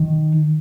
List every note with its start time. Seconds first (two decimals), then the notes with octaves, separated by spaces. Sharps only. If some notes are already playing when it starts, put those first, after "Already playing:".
Already playing: D#3